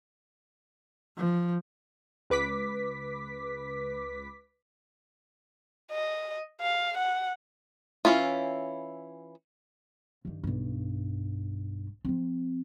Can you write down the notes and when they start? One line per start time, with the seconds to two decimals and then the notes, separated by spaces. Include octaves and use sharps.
1.17 F3
2.30 C#2 B4 D6 B6
5.92 D#5
6.61 F5
6.98 F#5
8.05 E3 G#3 C#4 E4 F4
10.25 G2 D#3
10.43 B1 G2
12.05 F3 C4